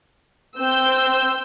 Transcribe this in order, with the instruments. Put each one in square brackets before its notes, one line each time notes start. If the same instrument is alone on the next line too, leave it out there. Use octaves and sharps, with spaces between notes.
[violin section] C4 E6 G6